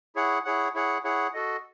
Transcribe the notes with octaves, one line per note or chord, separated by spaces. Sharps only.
E4 G#4 C#5 F#5
E4 G#4 C#5 F#5
E4 G#4 C#5 F#5
E4 G#4 C#5 F#5
F#4 A4 D#5